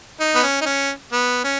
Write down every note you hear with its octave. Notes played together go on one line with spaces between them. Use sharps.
D#4
B3
C#4
D#4
C#4
B3
C#4